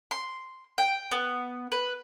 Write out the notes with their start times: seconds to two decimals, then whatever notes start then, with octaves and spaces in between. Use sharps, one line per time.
0.11 C6
0.78 G5
1.11 B3
1.72 B4